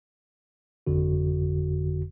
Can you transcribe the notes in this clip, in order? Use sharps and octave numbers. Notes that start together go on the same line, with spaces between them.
G1 F2 D3 F#4